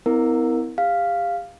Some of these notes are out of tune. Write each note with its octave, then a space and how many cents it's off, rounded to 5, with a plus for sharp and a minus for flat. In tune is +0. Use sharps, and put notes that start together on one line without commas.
B3 +45 E4 -25 A#4 +0
G4 +35 F5 -5